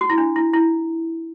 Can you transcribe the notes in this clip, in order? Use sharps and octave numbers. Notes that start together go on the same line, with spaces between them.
F#4
E4
D4
E4
E4